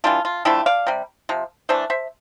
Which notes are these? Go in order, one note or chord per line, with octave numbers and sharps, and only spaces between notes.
E3 G3 D4 F4
F4
D3 F3 A3 E4 G4
D5 F5
C3 G3
C3 F3
E3 A3 D4 C5 E5
C5 E5